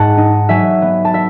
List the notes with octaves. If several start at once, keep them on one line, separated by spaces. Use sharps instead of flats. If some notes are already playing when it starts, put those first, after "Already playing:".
Already playing: G#2 F#5 A5
D#4
F#3 E5 G#5
B3
A5
E5